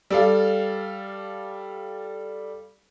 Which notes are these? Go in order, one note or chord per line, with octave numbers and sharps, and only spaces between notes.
G3 A4 F5